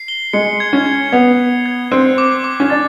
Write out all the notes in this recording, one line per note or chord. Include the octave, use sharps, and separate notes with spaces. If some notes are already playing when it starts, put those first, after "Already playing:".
Already playing: C7
G7
G#3 C#7
G#6
C#4
G#6
B3 F7
C#7
G#6
C4 F#6
D6
D6
C#4
D4 A6